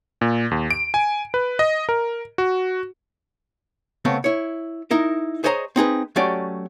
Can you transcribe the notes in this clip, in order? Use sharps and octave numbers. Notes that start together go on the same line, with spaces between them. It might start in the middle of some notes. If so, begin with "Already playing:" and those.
A#2
D#2
D7
G#5
B4
D#5
A#4
F#4
C#3 A3 B3 C4
E4 C#5
D#4 E4 A#4
G#4 C5 C#5 D#5 A5 A#5
C4 D#4 G#4 B4
F#3 A3 C#4 G4 D5